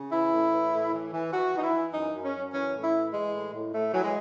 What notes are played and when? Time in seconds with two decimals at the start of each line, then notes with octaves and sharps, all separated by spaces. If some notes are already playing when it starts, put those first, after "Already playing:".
Already playing: C#3
0.12 E3 E4
0.32 A2
0.52 E3
0.72 A2
0.93 E3
1.13 E3
1.33 E3 F#4
1.53 E3 D#4
1.63 E4
1.73 E3
1.93 F#2 D#4
2.14 F#2
2.23 C#4
2.33 F#2
2.53 E3 C#4
2.73 A2
2.83 E4
2.93 E3
3.13 E3 G#3
3.34 A2
3.53 A2
3.73 A2 A3
3.94 E3 F#3
4.04 G#3